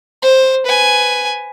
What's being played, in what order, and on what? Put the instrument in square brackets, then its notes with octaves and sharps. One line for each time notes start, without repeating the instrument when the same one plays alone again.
[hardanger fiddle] C5
B4 G#5